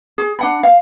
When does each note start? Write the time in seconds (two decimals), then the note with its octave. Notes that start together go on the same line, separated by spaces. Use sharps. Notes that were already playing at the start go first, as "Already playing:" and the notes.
0.18 G#4
0.39 D4 F#5 B5
0.63 F5